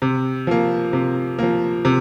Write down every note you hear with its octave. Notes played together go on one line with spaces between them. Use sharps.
C3
F3 A#3
C3
F3 A#3
C3